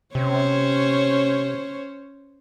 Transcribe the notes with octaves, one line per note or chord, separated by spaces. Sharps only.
C3 C#4 C5 C#5